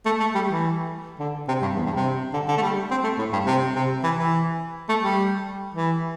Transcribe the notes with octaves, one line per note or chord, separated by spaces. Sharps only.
A3
A3
G3
E3
D3
C3
G2
E2
G2
C3
D3
D3
A3
G3
C4
A3
A2
G2
C3
C3
E3
E3
A3
G3
E3